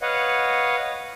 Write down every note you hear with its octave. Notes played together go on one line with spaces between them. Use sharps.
B4 C#5 D#5 F5 F#5